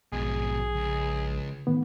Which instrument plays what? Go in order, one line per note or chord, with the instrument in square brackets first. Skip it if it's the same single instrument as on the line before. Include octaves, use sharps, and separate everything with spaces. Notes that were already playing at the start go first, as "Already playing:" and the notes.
[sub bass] A#1 [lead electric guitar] G#2 B2 [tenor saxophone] G#4
[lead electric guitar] C#2
[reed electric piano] A2 D#3 B3